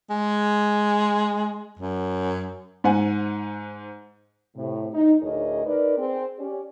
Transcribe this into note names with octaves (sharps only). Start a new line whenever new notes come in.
G#3
F#2
G#2 C5 F#5 G#5
A2 C3
D#4
D2 A2 G#4 A#4 C#5 D#5
D#4 A#4 B4 D5
C4 G#4
C#4 G4 D5